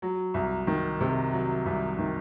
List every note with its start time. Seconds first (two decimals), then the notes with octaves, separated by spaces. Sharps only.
0.02 F#3
0.34 C2
0.67 D#3
1.00 C3
1.33 F#3
1.66 C2
1.98 D#3